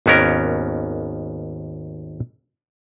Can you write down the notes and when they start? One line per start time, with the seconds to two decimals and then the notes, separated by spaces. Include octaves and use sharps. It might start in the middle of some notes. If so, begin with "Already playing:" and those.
0.06 G#1 D#2 B3 C#4 A#4